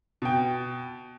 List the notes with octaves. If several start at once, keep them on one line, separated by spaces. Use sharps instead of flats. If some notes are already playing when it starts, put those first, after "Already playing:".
B2 G5